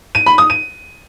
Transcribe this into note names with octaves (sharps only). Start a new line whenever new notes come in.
D#7
B5
D#6
D#7